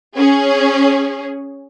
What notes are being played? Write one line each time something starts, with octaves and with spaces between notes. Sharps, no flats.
C#4 G#4